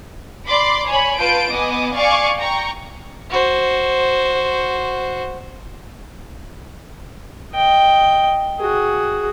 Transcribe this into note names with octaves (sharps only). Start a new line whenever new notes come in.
D5 B5 C6 D6
C#5 G#5 B5
F4 B4 A5 G6 D7
B3 D#5 G#5 D6
D5 F5 G#5 C#6 D6
G5 A#5 C#6
F#4 C5
D#5 G5
F#4 G#4